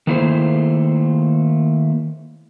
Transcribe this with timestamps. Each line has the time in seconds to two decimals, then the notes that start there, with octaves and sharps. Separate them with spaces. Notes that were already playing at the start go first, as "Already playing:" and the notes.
0.07 D#3 A3 A#3 E4 G#4 C5